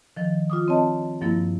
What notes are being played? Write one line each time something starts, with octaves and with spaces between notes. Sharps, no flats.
D#3 F3
F4 D6 D#6
C4 C#5 D#5 A5
G2 F3 A#3 E4